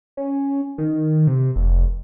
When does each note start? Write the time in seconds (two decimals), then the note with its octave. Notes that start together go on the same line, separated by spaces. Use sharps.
0.17 C#4
0.78 D#3
1.27 C3
1.56 F1